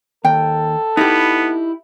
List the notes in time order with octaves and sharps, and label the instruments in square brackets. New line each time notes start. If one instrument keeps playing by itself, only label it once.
[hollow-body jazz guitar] D#2 [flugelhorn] A4 [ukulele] G5
[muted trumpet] B3 [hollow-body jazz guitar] D#4 E4 G4